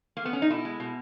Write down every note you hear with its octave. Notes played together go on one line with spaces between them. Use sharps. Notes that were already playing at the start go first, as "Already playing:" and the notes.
A#3
B3
C#4
D#4
B2 E4
G#3
B2